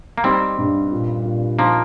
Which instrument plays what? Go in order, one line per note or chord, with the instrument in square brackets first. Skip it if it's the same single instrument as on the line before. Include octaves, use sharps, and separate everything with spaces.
[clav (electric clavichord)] A#3
[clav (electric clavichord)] G3 C4 [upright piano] D#4
[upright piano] G2
A#2
A#2
[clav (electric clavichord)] F3 A#3 [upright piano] D#4